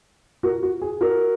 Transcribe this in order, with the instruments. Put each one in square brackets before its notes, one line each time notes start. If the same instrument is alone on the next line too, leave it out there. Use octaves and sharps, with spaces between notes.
[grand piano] F#4 A#4
F#4
G#4
F#4 A#4